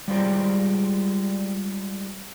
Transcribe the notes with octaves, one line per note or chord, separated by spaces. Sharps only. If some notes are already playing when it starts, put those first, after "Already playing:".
G3 G#3 F4 G4 C5 D5